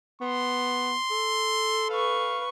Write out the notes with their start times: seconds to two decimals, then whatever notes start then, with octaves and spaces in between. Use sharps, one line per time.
0.21 B3 C6
1.11 A4
1.90 B4 F5 C#6